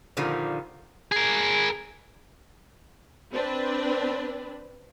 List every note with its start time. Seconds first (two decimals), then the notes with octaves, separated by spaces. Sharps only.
0.17 A#2 D3 D#3 F3 G3 A#3
1.12 G#4 A#4
3.32 C4 D4 B4